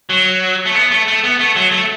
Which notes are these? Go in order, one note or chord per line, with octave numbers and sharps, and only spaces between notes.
F#3
A3
B3
A3
A3
B3
A3
F#3
A3